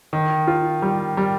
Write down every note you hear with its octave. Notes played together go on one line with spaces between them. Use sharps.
D#3
F4
G3
G3